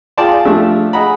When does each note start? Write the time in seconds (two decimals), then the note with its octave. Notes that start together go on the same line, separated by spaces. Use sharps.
0.18 F4 G#4 D5 G5 A5 C6
0.45 F3 A3 D4 F4 G4
0.93 G#4 D#5 F#5 A#5 B5